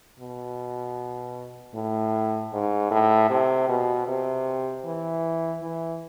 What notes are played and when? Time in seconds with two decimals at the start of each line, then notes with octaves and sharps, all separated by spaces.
0.19 B2
1.74 A2
2.53 G#2
2.91 A2
3.30 C3
3.69 B2
4.08 C3
4.85 E3
5.62 E3